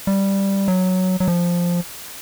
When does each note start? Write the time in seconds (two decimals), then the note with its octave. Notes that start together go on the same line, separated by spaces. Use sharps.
0.07 G3
0.68 F#3
1.20 F#3
1.28 F3